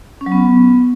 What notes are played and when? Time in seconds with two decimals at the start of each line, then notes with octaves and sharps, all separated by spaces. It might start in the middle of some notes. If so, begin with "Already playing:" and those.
0.21 C#4
0.26 F#3
0.32 B3